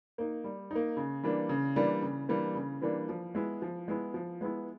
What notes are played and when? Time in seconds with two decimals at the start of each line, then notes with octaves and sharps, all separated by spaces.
0.18 A#3 D#4
0.44 G3
0.71 A#3 D#4
0.97 C#3
1.23 E3 G3 A#3 D4
1.49 C#3
1.76 E3 G3 A#3 D4
2.02 C#3
2.29 E3 G3 A#3 D4
2.55 C#3
2.82 E3 G3 A#3 D4
3.09 F3
3.35 G#3 B3 E4
3.62 F3
3.88 G#3 B3 E4
4.14 F3
4.41 G#3 B3 E4